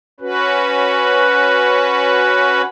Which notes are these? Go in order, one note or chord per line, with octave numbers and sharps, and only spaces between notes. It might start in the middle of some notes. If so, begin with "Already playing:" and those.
C#4 F#4 B4